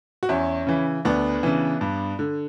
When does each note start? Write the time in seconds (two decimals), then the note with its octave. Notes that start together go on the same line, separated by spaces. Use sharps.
0.23 F#4
0.29 E2 C#4 E4
0.67 C#3 E3
1.05 D2 B3 D4
1.43 C#3 E3
1.81 G2
2.19 D3